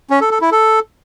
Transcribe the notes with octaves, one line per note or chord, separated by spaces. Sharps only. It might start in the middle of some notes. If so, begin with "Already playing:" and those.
C#4
A4
A4
E4
A4